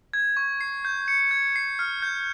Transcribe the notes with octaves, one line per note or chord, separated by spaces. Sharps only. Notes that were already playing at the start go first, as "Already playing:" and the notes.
G#6
C#6
C7
G6
C#7
G#6
C7
F6
G6